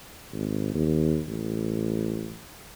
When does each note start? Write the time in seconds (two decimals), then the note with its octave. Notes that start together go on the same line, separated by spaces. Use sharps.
0.33 G#1
0.74 D#2
1.28 A1